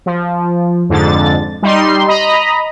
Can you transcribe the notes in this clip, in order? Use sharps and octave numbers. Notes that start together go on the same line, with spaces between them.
F3
F2 G#2 D3 A6
G3 D#4 C6
D#5 A#5 B5